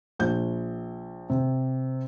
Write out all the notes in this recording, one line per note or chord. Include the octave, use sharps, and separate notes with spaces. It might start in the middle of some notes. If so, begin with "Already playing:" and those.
A#1 G6
C3